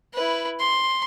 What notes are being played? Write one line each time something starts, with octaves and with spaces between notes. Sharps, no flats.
E4 B4
C6